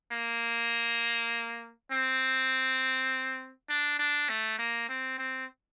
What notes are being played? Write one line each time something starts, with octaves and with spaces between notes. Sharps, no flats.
A#3
C4
D4
D4
A3
A#3
C4
C4